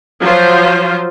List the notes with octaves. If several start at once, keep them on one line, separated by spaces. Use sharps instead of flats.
F3 F#3 F4 C5